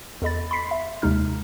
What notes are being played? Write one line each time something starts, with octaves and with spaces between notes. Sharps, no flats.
E2 A4 D#5 B5 A6
B5 C6 B6 C7
E5
D#2 C3 G#3 D#4 F6